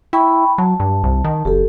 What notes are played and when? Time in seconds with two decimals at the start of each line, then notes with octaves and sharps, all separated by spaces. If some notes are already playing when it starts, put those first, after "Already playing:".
0.13 E4 G5 B5 C#6
0.58 F#3 A5
0.80 G2
1.03 C2
1.24 D#3
1.45 F#1 G4 A4